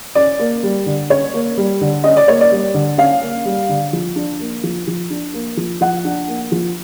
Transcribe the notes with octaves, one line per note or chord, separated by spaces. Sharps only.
C#4 D5
A#3
G3
D3
C#4 C#5
A#3
G3
D3
C#4 D#5
D5
A#3 C#5
D5
G3
D3
C#4 F5
A#3
G3
D3
F3
D4
A#3
F3
F3
D4
A#3
F3
F3 F#5
D4
A#3
F3